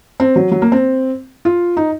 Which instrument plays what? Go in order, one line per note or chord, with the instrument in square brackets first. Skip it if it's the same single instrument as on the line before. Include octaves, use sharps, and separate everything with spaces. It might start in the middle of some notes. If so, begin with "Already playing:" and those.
[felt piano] C4
F#3
F#3
A#3
C4
F4
D#4